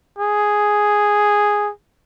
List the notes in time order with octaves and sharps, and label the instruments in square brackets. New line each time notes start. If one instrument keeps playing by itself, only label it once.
[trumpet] G#4